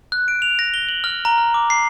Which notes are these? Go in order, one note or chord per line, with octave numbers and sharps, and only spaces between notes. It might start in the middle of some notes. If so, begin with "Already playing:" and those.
F#6
D7
F7
A#6
G7
F#7
F6
A#5
F6
D6
C7